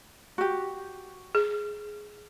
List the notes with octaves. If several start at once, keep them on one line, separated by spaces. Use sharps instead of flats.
F#4 G4
G#4